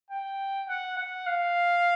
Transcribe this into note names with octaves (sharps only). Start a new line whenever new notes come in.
G5
F#5
F#5
F5